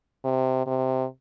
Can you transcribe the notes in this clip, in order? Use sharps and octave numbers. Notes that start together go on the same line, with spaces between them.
C3
C3